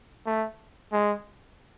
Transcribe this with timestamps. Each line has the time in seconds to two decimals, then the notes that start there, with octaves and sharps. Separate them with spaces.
0.26 A3
0.93 G#3